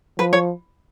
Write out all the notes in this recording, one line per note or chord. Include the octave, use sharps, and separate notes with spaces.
F3 B4
C#5